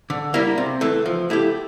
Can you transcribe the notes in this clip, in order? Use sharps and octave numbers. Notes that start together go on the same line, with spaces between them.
D3
G3 A#3 E4
C3
E3 A3
F3
A3 E4 G4